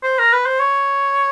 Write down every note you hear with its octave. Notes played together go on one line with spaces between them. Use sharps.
C5
A#4
B4
C5
C#5